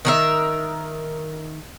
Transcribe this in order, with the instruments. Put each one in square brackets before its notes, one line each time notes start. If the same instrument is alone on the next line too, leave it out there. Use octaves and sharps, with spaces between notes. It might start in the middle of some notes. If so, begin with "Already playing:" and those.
[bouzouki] D#3 A#4 E5